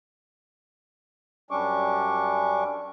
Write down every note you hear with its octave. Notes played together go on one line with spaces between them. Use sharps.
F#2 G3 C#4 D4 C#6 D6